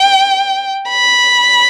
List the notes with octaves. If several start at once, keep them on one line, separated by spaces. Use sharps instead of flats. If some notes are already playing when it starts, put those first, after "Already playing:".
Already playing: G5
B5